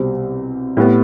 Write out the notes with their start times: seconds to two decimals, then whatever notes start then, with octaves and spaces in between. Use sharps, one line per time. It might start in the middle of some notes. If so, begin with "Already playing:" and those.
Already playing: C2 B2 G3 C4
0.77 A2 G3 B3